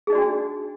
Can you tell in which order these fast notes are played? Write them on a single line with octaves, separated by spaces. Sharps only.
G#4 D#4 D5 F#4 D4